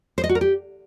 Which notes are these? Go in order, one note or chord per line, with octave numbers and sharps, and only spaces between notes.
C5
D#5
F#4
A#4
G4